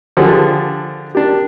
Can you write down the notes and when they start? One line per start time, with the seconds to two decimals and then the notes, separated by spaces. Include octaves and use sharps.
0.17 D3 F3 D4 G4 G#4
1.15 D4 G4